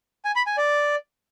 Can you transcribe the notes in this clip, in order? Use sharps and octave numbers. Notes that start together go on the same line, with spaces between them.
G#5
B5
G#5
D5